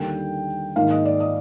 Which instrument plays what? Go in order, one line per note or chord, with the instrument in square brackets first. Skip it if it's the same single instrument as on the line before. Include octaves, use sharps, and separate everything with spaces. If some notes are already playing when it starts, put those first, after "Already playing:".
Already playing: [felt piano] D#2 D3 G3 A#3 G5
G#2 D#3 A#3 F5
D#5
D5
D#5